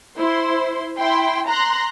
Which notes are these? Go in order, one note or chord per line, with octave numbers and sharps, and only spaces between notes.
E4 C5 C6
E4 G5 C6
A#5 C6 F#6